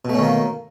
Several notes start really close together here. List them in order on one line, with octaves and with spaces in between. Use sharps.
B2 A3 C#4 D#3 A#3